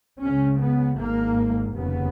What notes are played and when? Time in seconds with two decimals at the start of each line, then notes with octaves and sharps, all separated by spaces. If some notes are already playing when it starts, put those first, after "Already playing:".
0.22 C#2 C#3 C#4
0.60 B3
0.98 G#1 G#2 A#3
1.75 F1 D#2 C#3 B3